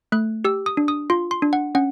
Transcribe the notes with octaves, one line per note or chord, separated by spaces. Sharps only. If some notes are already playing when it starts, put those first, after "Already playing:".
A3 F#6
G4 E6
D#6
D4
D#6
F4 C6
C6
D4
F#5
C#4 F#5